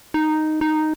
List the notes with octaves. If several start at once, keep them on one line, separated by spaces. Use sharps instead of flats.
D#4
D#4